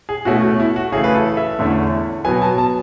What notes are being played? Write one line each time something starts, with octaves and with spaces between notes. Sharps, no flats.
G#4
B2 A3 C#4 E4 F#4
F#4
E4
F#4
C#3 E3 A3 G#4
B4
A4
E5
E2 D3 A3 C#4 E4
B2 F#3 B3 G#5
A5
A5